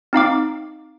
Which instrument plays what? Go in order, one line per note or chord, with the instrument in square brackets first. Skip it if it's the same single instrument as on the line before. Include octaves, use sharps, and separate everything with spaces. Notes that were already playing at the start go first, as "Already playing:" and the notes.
[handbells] C4 D#4 F5 D6